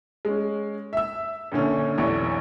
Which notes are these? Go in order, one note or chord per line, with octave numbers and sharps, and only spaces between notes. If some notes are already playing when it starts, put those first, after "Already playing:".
G#3 C#4
E5 E6
A#1 A#2 D3 C#4
F1 B1 E3 C#6